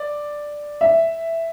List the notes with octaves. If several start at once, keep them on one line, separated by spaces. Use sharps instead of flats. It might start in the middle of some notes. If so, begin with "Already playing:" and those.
Already playing: D5
E5